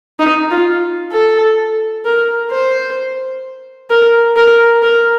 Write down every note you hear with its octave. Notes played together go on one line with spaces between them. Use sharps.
D#4
F4
A4
A#4
C5
A#4
A#4
A#4